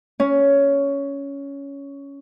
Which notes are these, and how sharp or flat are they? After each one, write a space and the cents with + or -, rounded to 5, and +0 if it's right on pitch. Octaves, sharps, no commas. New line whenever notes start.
C#4 +10